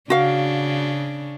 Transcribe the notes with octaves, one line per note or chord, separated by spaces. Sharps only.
C#3 D4 F#4 F5